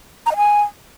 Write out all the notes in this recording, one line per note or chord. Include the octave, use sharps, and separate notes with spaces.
A#5
D#5
G#5